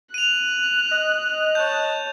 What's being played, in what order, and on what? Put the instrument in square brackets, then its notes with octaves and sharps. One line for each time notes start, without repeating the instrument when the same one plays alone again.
[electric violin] F#6 [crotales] D#7 F7
[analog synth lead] D#5
[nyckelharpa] C#5 A5 [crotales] G6